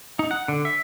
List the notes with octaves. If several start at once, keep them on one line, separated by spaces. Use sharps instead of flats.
D#4
F#5
D3
E5